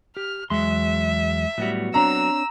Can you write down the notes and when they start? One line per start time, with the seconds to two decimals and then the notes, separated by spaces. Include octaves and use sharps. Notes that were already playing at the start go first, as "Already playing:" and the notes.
0.17 G4 F6
0.50 E2 F#3 G#3 E5 C6
1.58 A2 F#3 G3 B3 F#4
1.94 C4 D4 C#5 A#5 E6